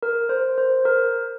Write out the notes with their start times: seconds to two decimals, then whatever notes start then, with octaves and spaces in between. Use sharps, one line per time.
0.03 A#4
0.29 C5
0.58 C5
0.85 A#4